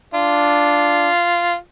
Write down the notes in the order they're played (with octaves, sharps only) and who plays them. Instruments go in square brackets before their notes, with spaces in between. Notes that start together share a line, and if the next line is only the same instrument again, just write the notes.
[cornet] D4 [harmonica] F4